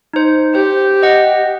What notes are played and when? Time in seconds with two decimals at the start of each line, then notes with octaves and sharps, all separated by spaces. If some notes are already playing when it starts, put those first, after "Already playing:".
0.14 D#4 C5
0.55 G4 C5
1.03 D#5 F#5